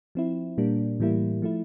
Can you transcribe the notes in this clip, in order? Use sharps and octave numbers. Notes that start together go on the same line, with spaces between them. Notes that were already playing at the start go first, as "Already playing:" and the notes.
F3 C4 E4
A#2 G3 A#3 D4
A2 E3 G3 A#3 E4
F3 A3 E4